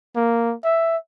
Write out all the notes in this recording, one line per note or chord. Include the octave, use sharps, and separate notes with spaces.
A#3
E5